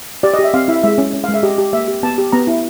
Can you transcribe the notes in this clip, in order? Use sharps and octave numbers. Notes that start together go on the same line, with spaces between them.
G4 D5
D#5
G4 E5
C4 F5
E4 E5
G#3 E5
C#4
C#4
F5
G#3
E5
G4 D#5
G4
A#3 E5
G4
B3 A5
G4
B3 A#5
E4